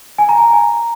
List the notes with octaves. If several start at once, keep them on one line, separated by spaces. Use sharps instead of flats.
G#5
A#5
G#5
G#5